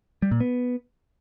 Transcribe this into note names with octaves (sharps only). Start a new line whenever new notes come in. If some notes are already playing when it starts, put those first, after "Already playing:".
G3
A#2
B3